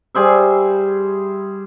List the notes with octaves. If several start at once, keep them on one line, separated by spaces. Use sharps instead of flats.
G3 G#4 C5 E5